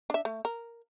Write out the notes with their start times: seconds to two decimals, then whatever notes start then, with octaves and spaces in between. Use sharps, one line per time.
0.10 D4 E5
0.25 A3
0.45 A#4